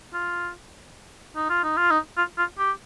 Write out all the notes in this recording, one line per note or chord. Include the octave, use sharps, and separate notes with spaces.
F4
D#4
F4
D#4
F4
D#4
F4
F4
G4